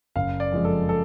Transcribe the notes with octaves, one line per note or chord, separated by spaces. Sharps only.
F#1 F5
D5
F2 F3 G#3
A4
A4